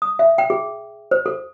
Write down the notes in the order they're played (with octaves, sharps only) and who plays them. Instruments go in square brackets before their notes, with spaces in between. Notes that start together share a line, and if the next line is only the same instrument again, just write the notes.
[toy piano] D#6
E5
G5
G#4
C5
A4